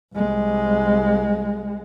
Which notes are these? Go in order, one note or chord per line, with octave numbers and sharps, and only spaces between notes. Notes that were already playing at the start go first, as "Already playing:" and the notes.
C2 G#3